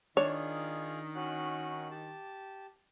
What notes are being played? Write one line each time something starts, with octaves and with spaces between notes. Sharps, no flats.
D#3 D4 F4 G#4 C#5
C#4 F#4 F#6
G4 A5